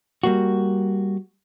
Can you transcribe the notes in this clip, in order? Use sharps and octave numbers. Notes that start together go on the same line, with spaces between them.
G3 A#3 F#4